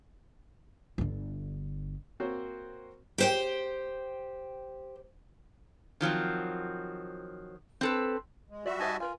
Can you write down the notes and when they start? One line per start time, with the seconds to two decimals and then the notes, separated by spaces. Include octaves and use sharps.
0.98 G1 D3
2.20 A#3 C4 F#4 C5 C#5
3.18 G4 C5 G5
6.01 D#3 F3 F#3 C4
7.81 C4 A4 B4
8.50 G#3
8.66 F#3 G3 F4 F#4 D5 E5
8.80 D#4 C5 D#5 G#5 A5
9.00 F4 A#4 B4 G#5